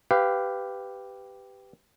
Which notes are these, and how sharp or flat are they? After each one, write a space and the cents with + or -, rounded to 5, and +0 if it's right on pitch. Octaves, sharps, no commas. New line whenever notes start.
G4 +0 B4 +15 F5 -10